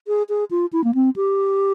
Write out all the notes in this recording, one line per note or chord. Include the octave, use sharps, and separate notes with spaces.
G#4
G#4
F4
E4
A#3
C4
G4